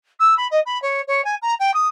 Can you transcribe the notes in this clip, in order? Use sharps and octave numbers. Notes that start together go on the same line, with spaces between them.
E6
B5
D#5
B5
C#5
C#5
G#5
A#5
G5
D#6